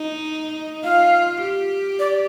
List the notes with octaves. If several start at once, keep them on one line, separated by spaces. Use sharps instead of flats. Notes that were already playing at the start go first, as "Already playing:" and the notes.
Already playing: D#4
F4 F5
G4
D5